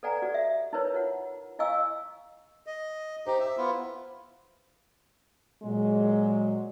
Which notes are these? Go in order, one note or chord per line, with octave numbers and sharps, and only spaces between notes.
A4 B4 D5 F#5 G#5 A#5
F#4 G4 A4 D5
E5
D#4 E4 A#4 B4 C#5
F4 F#5
E4 D#5 F5 G#5 C#6 E6
D#5
D#4 G4 C5
E5
B3 E4 F4
A#2 F#3 G#3